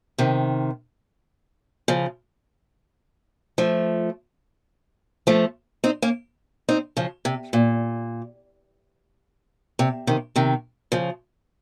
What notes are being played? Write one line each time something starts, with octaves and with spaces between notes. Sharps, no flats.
C3 D#3
C#3 F3
F3 A3
F3 A3
C4 D#4
A#3 C#4
C4 D#4
C#3 F3
C3
A#2
C3
C3 D#3
C3 D#3
C#3 F3